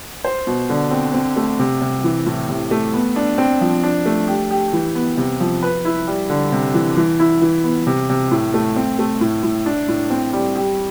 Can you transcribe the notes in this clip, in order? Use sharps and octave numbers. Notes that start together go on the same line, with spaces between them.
C5
B2
D3
C4
C4
A3
C3
C3
E3
A2
C3
A3
B3
D4
C4
F3
D4
A3
G4
G4
E3
B3
C3
F3
B4
E4
G3
D3
C3
E3
E3
E4
E3
B3
C3
C3
A2
A3
C4
A3
A2
A2
D4
A2
C4
G3
G4